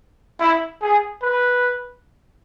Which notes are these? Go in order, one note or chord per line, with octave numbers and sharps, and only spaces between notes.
E4
G#4
B4